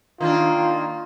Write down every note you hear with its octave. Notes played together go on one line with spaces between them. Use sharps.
D#3 A#3 D4 F4